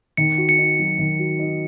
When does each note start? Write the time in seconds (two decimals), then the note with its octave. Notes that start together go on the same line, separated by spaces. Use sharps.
0.17 D#3 C#7
0.38 F#4
0.49 C#7
0.58 D#4
0.79 F#3
0.99 D#3
1.19 F#4
1.39 D#4